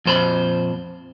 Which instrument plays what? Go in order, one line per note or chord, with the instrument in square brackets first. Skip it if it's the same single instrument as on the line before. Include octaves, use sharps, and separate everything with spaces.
[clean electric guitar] F2 A#2 C5 A#5 B5